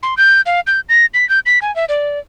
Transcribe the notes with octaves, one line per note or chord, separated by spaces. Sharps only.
C6
G6
F5
G6
A#6
B6
G6
B6
G#5
E5
D5